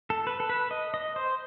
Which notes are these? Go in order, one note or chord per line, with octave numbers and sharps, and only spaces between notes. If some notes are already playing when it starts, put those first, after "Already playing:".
A4
B4
A4
B4
D#5
D#5
C5